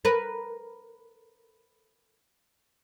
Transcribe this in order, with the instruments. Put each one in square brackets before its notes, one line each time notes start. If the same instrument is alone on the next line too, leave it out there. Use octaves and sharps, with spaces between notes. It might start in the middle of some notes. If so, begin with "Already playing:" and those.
[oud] A#4 B4